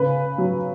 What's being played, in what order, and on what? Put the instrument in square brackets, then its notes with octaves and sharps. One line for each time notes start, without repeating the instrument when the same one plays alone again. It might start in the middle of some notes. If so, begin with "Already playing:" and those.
Already playing: [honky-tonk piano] C#3 B4
F#3